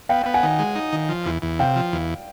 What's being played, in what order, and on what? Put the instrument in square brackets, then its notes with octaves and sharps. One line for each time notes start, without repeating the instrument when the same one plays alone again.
[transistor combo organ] B3 [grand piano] F5 G5
[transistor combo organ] B3 [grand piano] G5
[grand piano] F#5 G#5
[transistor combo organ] D#3
G#3
D#4
D#3
F3
E2
E2
[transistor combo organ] C3 [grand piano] F5 G5
[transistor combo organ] F3
E2